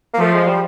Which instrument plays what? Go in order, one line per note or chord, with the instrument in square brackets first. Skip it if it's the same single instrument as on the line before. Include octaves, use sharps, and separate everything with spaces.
[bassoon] A#3
[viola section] F3 [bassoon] A3
[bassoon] G#3
G3